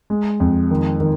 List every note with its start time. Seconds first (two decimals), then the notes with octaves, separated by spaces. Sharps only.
0.10 G#3
0.40 F2
0.71 D#3
1.00 D#3